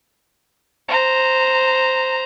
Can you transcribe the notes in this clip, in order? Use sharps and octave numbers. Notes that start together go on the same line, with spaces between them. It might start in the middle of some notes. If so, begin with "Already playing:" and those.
C5 A#5